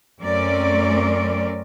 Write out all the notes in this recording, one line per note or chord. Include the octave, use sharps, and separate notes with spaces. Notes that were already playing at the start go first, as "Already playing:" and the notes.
F#2 A3 C4 C#4 A#4 D5